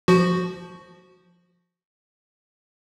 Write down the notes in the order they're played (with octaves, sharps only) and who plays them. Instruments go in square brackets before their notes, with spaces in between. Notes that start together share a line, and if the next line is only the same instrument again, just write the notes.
[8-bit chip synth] F3 F#4